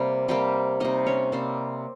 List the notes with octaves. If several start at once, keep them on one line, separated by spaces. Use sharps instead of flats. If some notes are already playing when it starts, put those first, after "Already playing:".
Already playing: C3 G3 A#3
C3 G3 A#3 G4 G5
C3 G3 A#3 D#4 D#5
C#4 C#5
C3 G3 A#3 C4 C5